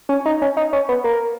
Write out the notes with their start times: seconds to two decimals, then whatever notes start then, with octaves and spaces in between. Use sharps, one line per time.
0.09 C#4
0.26 D#4
0.42 C#4
0.57 D#4
0.73 C#4
0.89 B3
1.04 A#3